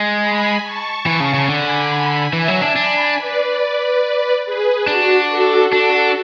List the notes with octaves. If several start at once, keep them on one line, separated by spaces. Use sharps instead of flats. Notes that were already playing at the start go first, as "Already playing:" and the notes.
Already playing: G#3
G#5 B5
A5 C#6
E3
C#3
C#3
D3 G#5 B5
E3 E5 G#5
F#3
D4
D4 G#5 B5
B4 D5
G#4 B4
D4 F#4
F#4 A4
D4 F#4 A4